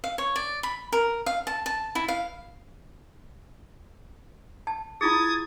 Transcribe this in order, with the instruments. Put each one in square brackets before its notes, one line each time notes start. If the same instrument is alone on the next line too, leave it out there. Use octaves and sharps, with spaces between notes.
[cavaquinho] F5
C#5
D5
B5
A#4
F5
A5
A5
E4
F5
[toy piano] A5
[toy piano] E4 F4 G#4 [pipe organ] D#6 G#6 A6